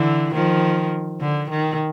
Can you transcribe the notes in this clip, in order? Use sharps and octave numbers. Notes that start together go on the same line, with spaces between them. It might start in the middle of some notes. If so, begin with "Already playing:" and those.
Already playing: D3 E3
D#3 F3
D3
D#3